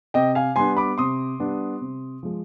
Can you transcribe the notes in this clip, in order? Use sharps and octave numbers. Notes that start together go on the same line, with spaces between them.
C3 D#5 G5
F5 G#5
G3 B3 D4 G#5 C6
B5 D6
C3 C6 D#6
G3 B3 D4
C3
F3 G#3